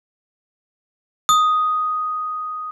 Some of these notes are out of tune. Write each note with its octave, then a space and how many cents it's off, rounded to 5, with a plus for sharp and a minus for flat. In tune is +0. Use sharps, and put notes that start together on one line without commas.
D#6 +0